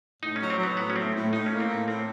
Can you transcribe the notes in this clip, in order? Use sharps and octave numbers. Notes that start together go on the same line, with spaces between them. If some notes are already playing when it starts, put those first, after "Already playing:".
A2 D#4
F#3 C#4
C4
F#3 B3
A2 B3
C#4
A2 C4
A2
A2 D#4
A#3 C#4
C4
A2
A2 C4